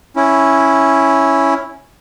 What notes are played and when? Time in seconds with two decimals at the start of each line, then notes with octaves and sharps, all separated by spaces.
0.16 C#4 E4